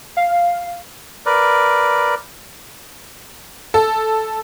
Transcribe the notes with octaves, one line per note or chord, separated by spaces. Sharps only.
F5
A#4 B4 D5
A4